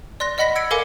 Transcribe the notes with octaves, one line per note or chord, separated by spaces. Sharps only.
D5 C6 F#6 A#6
D5 D#5 F#5 B5 A#6 B6
E6 G#6 C#7 D7
A4 A#4 F5 G#5 D6 C#7